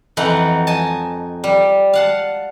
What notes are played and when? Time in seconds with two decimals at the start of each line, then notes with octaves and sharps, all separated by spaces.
0.17 F2 E3 D#4 E4 F#5
0.67 D#5 G#5 A5
1.44 G3
1.93 F5 F#5 A5